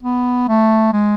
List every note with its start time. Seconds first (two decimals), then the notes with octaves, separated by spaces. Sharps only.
0.03 B3
0.48 A3
0.93 G#3